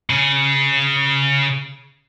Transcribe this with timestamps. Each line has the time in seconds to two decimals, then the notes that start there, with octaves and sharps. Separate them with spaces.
0.10 C#3 G#4